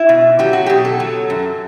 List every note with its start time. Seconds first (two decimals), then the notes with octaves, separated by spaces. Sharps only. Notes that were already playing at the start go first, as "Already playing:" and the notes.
Already playing: E4
0.09 B2
0.39 F#3 G4
0.53 F#4
0.66 B2 G4
0.85 A4
1.00 F#3
1.30 F#2